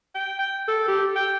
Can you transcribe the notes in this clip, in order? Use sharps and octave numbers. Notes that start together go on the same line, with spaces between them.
G5
G5
A4
G4
G5